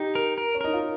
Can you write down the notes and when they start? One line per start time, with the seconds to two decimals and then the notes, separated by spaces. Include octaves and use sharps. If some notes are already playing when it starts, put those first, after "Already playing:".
Already playing: D#4 G4
0.15 A#4
0.38 A#4
0.55 C#4
0.61 D#4 A#4
0.73 F4